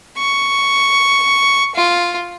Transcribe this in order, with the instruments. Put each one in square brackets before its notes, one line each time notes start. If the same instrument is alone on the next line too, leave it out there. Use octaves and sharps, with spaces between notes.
[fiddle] C#6
F4